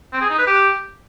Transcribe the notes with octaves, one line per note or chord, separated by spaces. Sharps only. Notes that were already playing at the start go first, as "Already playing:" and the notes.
C4
G#4
D#4
B4
G4